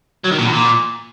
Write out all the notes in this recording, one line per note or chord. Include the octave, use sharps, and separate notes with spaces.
F#3
D#3
A#2
E2
A#2